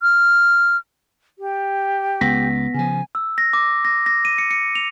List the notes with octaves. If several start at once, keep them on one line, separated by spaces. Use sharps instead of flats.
F6
G4
C#2 B3 A#6 B6
C#3 F3 G#5
E6
A#6
D6
A#6
A#6
D#7
C#7
C#7
F7